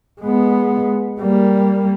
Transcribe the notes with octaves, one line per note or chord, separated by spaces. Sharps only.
G#3 B3
G3 A#3